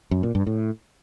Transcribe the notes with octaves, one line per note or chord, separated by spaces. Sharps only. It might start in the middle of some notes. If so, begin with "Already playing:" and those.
F#2
A#2
G2
A2